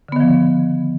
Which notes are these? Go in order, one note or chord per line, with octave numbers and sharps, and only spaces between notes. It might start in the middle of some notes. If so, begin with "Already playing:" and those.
D3 D#3 F3 B3